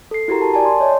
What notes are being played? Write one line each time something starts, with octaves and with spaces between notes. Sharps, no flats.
A4 C7
E4 F#4 G4 A#4 A#5
A#4 A5
D5 G#5 A5
C6
C#5 D#5